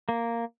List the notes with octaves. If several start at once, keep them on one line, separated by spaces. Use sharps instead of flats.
A#3